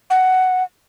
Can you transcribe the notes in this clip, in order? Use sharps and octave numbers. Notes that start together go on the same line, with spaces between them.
F#5